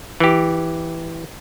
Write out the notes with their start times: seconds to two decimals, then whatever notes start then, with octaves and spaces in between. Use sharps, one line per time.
0.20 E3 G4